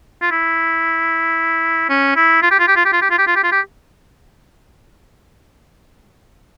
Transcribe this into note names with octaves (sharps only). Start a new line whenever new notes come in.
F4
E4
C#4
E4
F4
G4
F4
G4
F4
G4
F4
G4
F4
G4
F4
G4
F4
G4